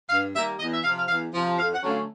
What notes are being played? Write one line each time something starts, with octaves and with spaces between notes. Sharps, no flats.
G2 F5
D#3 G3 A#3 E5
E2 D#5
E5
C3 F3 F5
F5
E2 F5
C3 F3
F2 F5
F#5
D3 F#3 A3 C#4
F5